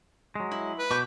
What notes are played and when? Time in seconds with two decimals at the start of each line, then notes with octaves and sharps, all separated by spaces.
0.35 F#3 G#3
0.52 E4
0.79 B4
0.91 B2 C#6 D6 G6